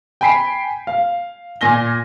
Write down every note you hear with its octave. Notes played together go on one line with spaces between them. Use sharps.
G5 G#5 B5 B6 C7 D7
F5
A#2 G#5 A#6 G7